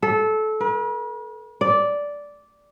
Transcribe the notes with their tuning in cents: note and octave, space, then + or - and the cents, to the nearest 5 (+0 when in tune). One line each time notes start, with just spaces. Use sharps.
A4 -20
B4 -45
D5 -10